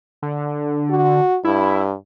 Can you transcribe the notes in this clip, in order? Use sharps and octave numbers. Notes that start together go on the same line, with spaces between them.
D3
F#4
G2 E4